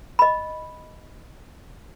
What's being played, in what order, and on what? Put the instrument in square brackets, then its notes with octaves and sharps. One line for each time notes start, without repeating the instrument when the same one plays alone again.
[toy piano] D#5 B5